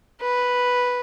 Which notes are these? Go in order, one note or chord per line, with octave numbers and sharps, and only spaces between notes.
B4